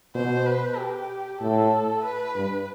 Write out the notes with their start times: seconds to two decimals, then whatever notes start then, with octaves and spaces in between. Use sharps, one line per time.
0.15 B2 C5
0.46 B4
0.78 G4
1.41 A2 A4
2.04 B4
2.35 G2